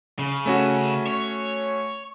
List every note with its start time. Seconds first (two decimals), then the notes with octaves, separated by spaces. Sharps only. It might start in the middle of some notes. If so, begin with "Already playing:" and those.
0.19 C#3
0.46 A3 C#4 F#4
1.07 C#5